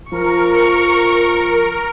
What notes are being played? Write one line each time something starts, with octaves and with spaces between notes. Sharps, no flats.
F3 A#4 C#6